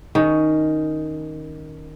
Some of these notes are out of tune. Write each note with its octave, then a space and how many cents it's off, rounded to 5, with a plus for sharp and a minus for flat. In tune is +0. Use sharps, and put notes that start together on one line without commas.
D#3 +0 C#4 +0